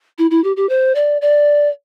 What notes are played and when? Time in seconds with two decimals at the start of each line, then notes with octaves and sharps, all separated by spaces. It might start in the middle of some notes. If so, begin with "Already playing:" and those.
0.18 E4
0.31 E4
0.44 G4
0.57 G4
0.69 C5
0.95 D5
1.22 D5